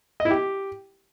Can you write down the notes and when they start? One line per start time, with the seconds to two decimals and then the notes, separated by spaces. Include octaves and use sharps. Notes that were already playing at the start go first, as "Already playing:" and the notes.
0.20 D#5
0.25 E4
0.30 G4